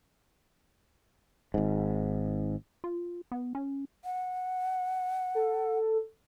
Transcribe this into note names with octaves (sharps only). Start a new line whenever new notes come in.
G#1 G#2
F4
B3
C#4
F#5
A4